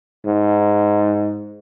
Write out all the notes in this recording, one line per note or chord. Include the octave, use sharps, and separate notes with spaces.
G#2